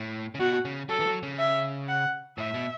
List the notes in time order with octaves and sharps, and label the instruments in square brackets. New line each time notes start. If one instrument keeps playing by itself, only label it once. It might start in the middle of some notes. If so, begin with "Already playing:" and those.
Already playing: [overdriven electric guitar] A2
C#3
[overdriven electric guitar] B2 [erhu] F#4
[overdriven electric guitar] C#3
[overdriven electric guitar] F#3 [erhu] A4
[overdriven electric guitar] E3
F#3
C#3
[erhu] E5
F#5
[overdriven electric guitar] A2 [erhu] E5
[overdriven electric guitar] B2